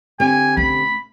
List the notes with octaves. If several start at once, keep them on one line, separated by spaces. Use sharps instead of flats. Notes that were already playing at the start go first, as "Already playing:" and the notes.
D3 C4 G4 G#5
A3 C#4 B5